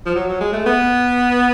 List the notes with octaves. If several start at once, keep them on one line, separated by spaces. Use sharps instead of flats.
F3
F#3
F#3
G#3
A3
B3